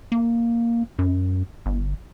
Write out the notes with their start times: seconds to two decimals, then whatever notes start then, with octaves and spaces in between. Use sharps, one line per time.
0.12 A#3
0.99 F#2
1.66 G1